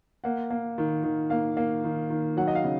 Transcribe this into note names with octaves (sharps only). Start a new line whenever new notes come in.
A#3 F#5
A#3
D#3
D#3
A#3 F5
A#3
D#3
D#3
F#3 F#5
D#5
F5
C#3